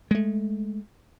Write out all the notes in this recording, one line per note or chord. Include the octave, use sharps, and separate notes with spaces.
G#3 A3